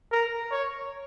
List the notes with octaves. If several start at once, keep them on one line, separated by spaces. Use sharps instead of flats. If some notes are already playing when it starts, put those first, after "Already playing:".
A#4
C#5